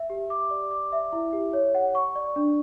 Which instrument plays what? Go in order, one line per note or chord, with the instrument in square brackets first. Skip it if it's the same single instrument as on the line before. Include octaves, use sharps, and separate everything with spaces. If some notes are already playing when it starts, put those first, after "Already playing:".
Already playing: [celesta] E5
G4
D6
D5
D6
E5
E4
G4
C#5
F#5
C#6
D5
D4